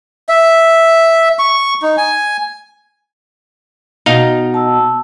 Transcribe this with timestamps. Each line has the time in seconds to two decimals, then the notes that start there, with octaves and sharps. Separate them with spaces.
0.29 E5
1.39 C#6
1.82 D#4
1.97 G#5
4.06 B2 D#4 F5
4.54 A5 E6